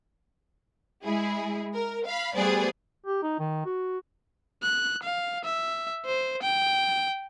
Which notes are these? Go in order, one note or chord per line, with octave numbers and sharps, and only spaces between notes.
G#3 E4 G#4
A#4
F5 B5
G3 A3 B3 G#4 C5 D5
G4
D#4
D#3
F#4
F#6
F5
E5
C5
G5